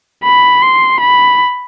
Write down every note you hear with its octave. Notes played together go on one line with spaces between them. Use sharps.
B5
C6
B5